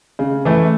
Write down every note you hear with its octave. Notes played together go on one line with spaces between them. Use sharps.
C#3
E3 A3 E4